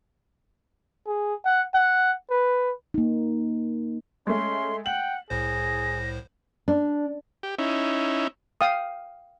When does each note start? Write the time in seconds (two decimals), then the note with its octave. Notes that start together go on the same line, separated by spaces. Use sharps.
1.07 G#4
1.45 F#5
1.75 F#5
2.31 B4
2.94 A#3 D#4
4.27 G#3 A3 C#4 C6
4.86 F#5 G5 F#7
5.30 C2 A2 G#4 C5 A#6
6.68 D4
7.43 G4
7.58 C#4 D#4 E4
8.61 F5 G5 D#6